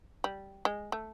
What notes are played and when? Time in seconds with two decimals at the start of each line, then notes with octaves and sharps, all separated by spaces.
0.24 G3
0.65 G#3
0.92 A3